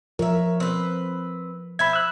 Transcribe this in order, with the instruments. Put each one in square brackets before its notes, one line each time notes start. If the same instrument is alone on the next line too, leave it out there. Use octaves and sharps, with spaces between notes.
[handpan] F3 A#4 [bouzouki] C#5 E5
[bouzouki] C4 B4
[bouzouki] C5 E5 [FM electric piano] B5 G#6
[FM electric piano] E6 F#6